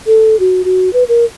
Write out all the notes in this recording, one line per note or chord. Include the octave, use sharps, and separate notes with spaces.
A4
F#4
F#4
B4
A#4